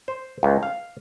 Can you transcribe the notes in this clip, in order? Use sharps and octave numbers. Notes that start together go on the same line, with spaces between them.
C5
C#2
F5